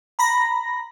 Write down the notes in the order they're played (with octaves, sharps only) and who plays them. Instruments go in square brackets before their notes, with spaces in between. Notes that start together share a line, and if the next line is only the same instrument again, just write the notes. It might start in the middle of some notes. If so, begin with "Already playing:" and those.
[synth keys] A#5 B5 A#6